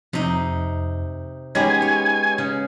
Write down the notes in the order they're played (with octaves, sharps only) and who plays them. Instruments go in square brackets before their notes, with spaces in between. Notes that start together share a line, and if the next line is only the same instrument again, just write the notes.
[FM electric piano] F2 [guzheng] C3 D#4
[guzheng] G#3 B3 [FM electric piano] C#4 D#4 G4 [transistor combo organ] G#5
[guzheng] C#5
C#3